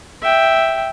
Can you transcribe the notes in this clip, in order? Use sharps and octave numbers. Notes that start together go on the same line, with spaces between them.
E5 G5